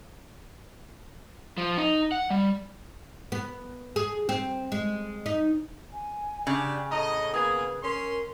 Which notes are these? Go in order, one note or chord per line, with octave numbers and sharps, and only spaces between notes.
F3
D#4
F#5
G3
B3
G#4
C4
G#3
D#4
G#5
C#3 D4 G4
A2 D#5 A#5
A#3 B3 G#4 B4 D#6 G#6
C#4 A#4 C6